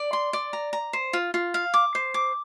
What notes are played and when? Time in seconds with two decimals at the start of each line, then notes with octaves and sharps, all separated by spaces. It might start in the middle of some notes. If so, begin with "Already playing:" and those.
Already playing: D5
0.13 C6
0.33 D5
0.53 A#5
0.73 A#5
0.93 C5
1.13 F4
1.34 F4
1.54 F5
1.74 D6
1.95 C5
2.14 D6